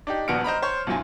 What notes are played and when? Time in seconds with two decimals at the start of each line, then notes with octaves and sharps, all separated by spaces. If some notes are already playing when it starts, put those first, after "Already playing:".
0.07 D4 D#4 G4
0.28 D#1 A#1 B3 F#4 F6 D7
0.44 C5 D#5 A#5 B5
0.62 C5 C#5 C#6
0.87 B1 F#2 F#3 F4 G#5